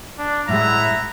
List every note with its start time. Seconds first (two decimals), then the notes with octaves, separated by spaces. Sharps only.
0.18 D4
0.49 A2 G#3 E4 E5 F#5 A#5